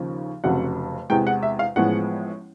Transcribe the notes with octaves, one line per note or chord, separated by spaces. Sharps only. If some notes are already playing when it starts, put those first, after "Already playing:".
Already playing: D#2 C#3 F3
F1 F2 C#3 F#3 F#5
E2 C3 E3 G#3 G5
F#5
E5
F5
A1 A2 F3 G#3 B3 F#5